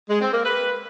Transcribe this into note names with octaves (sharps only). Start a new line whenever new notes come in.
G#3
C4
A#3
B4